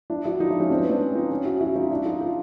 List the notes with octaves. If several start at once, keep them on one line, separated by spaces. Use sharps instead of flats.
D4 E4
E4 F#4
D#4 F4
D4 E4
C#4 D#4
C4 D4
B3 C#4
C4 D4
D#4 F4
C#4 D#4
E4 F#4
E4 F#4
D#4 F4
D4 E4
D#4 F4
D#4 F4